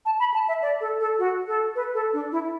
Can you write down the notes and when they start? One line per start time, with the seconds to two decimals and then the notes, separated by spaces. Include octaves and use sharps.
0.06 A5
0.20 B5
0.34 A5
0.48 E5
0.62 D5
0.81 A4
1.00 A4
1.19 F#4
1.47 A4
1.75 B4
1.94 A4
2.13 D4
2.32 E4